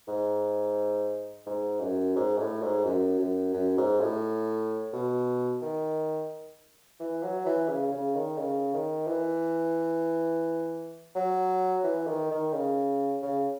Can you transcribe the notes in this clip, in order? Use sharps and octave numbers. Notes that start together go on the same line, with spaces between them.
G#2
G#2
F#2
G#2
A2
G#2
F#2
F#2
F#2
G#2
A2
B2
D#3
E3
F#3
E3
C#3
C#3
D#3
C#3
D#3
E3
F#3
E3
D#3
D#3
C#3
C#3